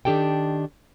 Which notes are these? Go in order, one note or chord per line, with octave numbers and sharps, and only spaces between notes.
D#3 D4 G4 A4 G5